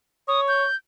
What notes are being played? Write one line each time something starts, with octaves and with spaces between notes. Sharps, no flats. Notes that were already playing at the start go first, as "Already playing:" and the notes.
C#5 D#6
G6